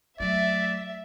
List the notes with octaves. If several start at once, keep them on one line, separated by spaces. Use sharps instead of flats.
F#3 A3 D5 E5